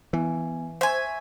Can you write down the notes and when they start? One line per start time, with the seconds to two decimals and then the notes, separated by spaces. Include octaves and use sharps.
0.13 E3 B3 G#5
0.81 C5 E5 G#5 C#6